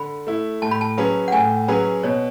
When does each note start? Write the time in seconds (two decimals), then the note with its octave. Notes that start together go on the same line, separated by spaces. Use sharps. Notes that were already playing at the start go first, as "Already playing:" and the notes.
Already playing: D3 B5
0.27 A3 E4
0.62 A2 A5
0.71 B5
0.81 A5
0.98 F#3 C#4 G#4 B4
1.28 F#5
1.32 A2 G#5
1.68 F#3 C#4 G#4 B4
2.03 B2 C#5